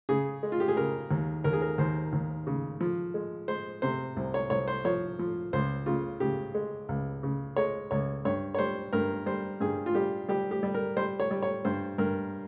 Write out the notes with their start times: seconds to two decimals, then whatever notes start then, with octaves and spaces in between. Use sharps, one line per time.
0.09 C#3 G#4
0.43 G#3
0.52 F4
0.60 G4
0.68 G#4
0.77 C#3 A#4
1.11 D#2
1.44 D#2 A#4
1.53 G#4
1.62 A#4
1.78 D#2 C5
2.13 D#2
2.47 C#3
2.81 F3
3.14 G#3
3.48 G#3 C5
3.82 C3 C5
4.16 C2
4.34 C#5
4.50 C2 C#5
4.68 C5
4.85 F3 C#5
5.19 F3
5.53 C#2 C5
5.86 C#3 F4
6.20 C#3 G4
6.55 G#3
6.89 C#2
7.23 C#3
7.56 G#3 C#5
7.91 C#2 C#5
8.25 G2 C#5
8.54 C#5
8.58 G3 C5
8.93 G2 A#4
9.26 G3 C5
9.60 G2 G#4
9.86 F4
9.95 G3 G4
10.29 G3 G4
10.51 G4
10.63 G3
10.74 A#4
10.97 G3 C5
11.20 C#5
11.31 G3
11.43 C#5
11.65 G2 C5
11.98 G2 A#4